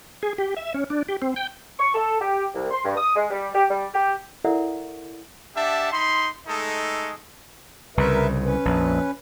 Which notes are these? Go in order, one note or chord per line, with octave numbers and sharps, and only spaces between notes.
G#4
G4
E5
C#4
D4
G4
C4
G5
C#6
A4
G4
C2
C6
G2
D#6
G#3
G3
G4
G3
G4
E4 A4 A#4 D5 E5 F#5
D4 G4 E5 F#5 A5
D#4 B5 C6
G#3 A3 D#4 A4
C2 C#3 A#4 B4 E5
C#4 B4
A#1 F2